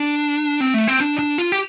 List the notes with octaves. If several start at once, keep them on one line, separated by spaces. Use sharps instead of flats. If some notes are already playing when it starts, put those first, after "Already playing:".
Already playing: D4
C4
A3
C4
D4
D4
F4
G4